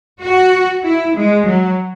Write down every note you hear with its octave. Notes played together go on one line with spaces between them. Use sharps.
F#4
E4
G#3
F#3